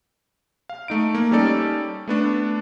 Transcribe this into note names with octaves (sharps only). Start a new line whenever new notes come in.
F5
A3 D#4 D7
A#3
G3 C#4 D#4 A4 D5
A3 B3 D4